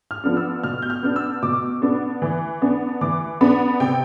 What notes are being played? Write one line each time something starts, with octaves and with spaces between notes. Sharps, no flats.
F6
F3 B3 D4
E6
B2 F6
G6
F6
B3 D4
E6
B2 D6
B3 D4
E3
B3 D4
E3 D6
B3 D4 B5
C3 G5